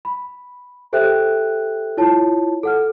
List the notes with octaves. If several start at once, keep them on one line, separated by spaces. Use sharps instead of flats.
B5
G4 A4 C5 E5 G5 F#6
E4 F4 C#5 A5
A4 F#5 F6